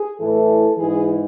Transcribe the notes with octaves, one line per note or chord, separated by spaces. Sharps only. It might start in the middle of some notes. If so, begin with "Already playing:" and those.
Already playing: G#4
A2 E3 A4
G#2 E3 G#4